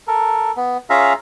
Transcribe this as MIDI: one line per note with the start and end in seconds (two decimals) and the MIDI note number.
0.07 0.52 69
0.07 0.52 70
0.56 0.77 59
0.90 1.13 61
0.90 1.13 65
0.90 1.13 68
0.90 1.13 76
0.90 1.13 77
0.90 1.13 82